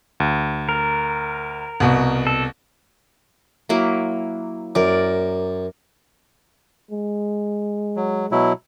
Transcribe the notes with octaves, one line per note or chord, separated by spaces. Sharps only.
D2
A#4
C2 B2
A4
F#3 A#3 E4
F#2 A#4 D5
G#3
F#3
B2 F#3 E4